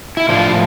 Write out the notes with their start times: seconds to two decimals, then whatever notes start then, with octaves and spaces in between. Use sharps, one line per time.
0.17 E4
0.29 A2 F3 D4 F4